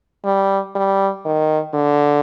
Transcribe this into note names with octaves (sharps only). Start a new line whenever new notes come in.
G3
G3
D#3
D3